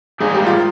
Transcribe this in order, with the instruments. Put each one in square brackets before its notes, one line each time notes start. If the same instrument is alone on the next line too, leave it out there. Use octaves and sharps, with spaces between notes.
[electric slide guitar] G#2 G3 A#3 D#4 [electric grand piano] G#4
[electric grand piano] G4
F4